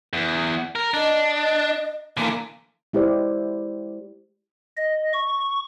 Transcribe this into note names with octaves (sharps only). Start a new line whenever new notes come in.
E2
A#4
D4 D#5
D3 E3 A#3
G#3 E4 G4 C5 D5
D#5
C#6